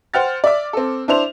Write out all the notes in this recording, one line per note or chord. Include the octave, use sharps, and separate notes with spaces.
C5 F#5 G5 F6 A6
D5 E5 D6
C4 A4
D4 E4 C5 F7